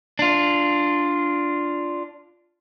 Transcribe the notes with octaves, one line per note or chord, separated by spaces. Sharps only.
D4 F4